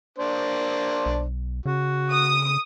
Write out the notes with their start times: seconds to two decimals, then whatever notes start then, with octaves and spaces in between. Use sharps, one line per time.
0.18 A#3 D4 C5
1.06 B1
1.65 C#3 F#4
2.12 D#6